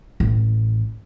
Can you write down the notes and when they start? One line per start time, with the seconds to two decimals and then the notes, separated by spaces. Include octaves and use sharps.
0.20 A1